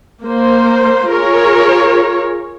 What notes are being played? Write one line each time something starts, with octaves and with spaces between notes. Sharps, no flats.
A#3 C5
F4 G#4 A#4 C#5